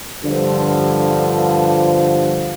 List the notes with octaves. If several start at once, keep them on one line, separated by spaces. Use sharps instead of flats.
G2 D3 F3